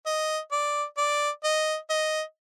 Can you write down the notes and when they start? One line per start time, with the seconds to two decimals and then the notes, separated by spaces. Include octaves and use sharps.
0.06 D#5
0.52 D5
0.97 D5
1.44 D#5
1.90 D#5